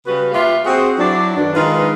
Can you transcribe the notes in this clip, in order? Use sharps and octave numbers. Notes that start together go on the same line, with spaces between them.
C#3 G3 F#4 B4
A#3 F4 G4 B4 E5 F5
C4 F#4 G#4
F#3 D4 E4
F#2 D3 D#3 B3 D4
D#3 G#3 D#4 F4 B4